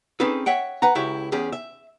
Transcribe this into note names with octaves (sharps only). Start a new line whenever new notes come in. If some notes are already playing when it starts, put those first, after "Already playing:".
C4 C#4 D#4 G#4 A4 B4
C#5 E5 F#5 G5
B4 F#5 A#5
C#2 E4 F#4 G4 C#5 E5
E2 C#4 G4 G#4
E5